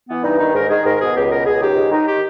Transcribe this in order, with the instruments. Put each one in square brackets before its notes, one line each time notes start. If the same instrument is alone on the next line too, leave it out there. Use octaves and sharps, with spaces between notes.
[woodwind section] E3 B3
G2 D#4
D#3 D#4
G#2 A#4
D#3 G#4
G#2 A#4
B2 G#4
C#2 G4
B2 A#4
C#2 G#4
D#3 G4
G#2
D#3 D#4
G4